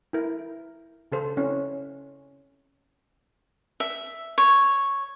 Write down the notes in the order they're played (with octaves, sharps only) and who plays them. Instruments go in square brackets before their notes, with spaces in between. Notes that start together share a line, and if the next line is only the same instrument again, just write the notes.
[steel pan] E4 A#4
C#3 A4 C5
C4 C#4 E4
[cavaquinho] E5
C#5